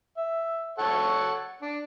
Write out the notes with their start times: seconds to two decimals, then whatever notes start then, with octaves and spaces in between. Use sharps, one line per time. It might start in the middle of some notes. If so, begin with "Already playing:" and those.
0.17 E5
0.78 A4 C#5 F#5
1.62 D4